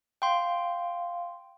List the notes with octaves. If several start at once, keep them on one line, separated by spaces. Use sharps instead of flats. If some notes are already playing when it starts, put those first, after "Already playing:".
F5 G5 C6